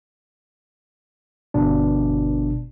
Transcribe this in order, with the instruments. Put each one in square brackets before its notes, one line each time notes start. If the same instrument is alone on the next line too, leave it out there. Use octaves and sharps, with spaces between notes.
[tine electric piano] G1 B2 D4